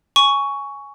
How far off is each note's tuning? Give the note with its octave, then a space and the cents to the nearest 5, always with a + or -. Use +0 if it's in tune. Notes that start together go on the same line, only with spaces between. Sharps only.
G#5 +0 C#6 +10